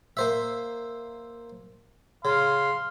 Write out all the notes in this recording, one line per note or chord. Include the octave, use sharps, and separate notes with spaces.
A#3 C5 E5
C#3 F5 C6